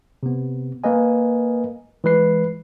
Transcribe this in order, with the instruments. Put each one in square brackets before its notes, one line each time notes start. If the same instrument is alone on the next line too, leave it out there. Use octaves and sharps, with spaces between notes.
[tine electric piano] C3 B3
A#3 A#4 B4 D#5 G#5
E3 G#3 B4 C7